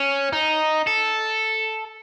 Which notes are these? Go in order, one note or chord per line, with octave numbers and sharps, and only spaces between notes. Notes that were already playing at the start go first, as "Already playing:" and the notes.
Already playing: C#4
D#4
A4